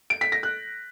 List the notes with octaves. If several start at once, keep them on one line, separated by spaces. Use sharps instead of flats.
D7
B6
A#6
F#6